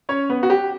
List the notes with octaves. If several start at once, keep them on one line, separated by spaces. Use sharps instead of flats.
C#4 C#5
B3 B4
F#4
G4